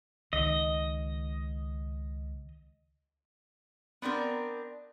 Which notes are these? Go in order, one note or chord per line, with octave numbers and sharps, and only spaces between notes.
C#2 D#3 D#5
B3 C4 D4 A#4